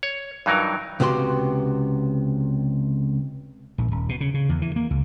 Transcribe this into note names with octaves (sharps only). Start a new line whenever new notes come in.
C#5
G2 E3 F#3 D#4 A#4
C#2 C3 B3 F#4 G4 C6
A#1
D#1
B2
C#3
C#3
E2
E3
A#3
C#2